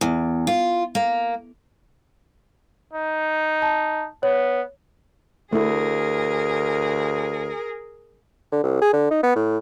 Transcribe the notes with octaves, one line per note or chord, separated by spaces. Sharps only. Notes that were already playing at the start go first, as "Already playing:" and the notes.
E2
F4
A#3
D#4
A5
B3 C#5
D2 A3 E4 G#4 A#4
D3
C2
G#4
D3
D#4
B3
A2